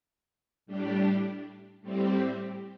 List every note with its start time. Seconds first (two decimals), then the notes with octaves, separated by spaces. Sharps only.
0.66 A2 G3 D4 G4
1.81 A2 G3 C4 G4